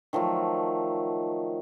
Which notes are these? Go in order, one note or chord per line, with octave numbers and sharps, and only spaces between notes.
D#3 F3 F#3 A3